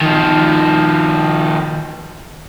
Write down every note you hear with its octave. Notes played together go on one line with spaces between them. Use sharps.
D#3 F3